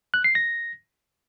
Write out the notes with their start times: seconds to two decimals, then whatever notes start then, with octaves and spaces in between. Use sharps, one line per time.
0.14 F#6
0.24 C7
0.35 A#6